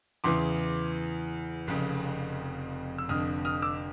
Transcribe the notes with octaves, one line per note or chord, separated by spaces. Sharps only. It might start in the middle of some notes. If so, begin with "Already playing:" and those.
E2 C#3 E3 C6 D6
F1 F2 C#3
E6
F1 F2 D3 D#6 F6
D#6 F6
D6 E6